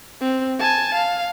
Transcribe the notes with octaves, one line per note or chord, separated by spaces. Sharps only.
C4
G#5 A5
F5